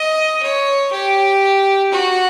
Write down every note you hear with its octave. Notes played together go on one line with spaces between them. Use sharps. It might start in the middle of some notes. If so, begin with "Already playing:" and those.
Already playing: D#5
C#5
G4
F#4